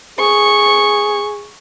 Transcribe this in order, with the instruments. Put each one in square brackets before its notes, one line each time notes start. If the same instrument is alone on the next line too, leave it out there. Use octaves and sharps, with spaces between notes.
[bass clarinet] G#4 [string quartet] C#6